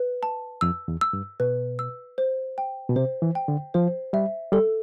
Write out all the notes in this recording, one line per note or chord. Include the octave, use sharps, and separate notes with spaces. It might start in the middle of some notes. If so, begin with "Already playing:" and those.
Already playing: B4
A5
F2 E6
E2
E6
G2
B2 B4
E6
C5
G5
B2
C3 C5
E3
G5
D3
F3 C5
G3 E5
G3 A4